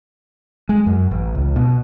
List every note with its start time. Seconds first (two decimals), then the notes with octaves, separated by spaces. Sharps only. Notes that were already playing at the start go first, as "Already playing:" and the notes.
0.69 G#3
0.86 F#2
1.11 A1
1.35 C#2
1.56 B2